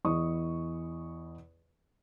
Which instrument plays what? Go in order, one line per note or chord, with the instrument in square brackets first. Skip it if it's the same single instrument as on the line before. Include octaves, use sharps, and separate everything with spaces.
[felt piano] E2 E4 D#5 C#6 D#6